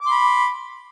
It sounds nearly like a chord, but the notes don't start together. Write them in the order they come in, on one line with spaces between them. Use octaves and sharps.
D6 C6 B5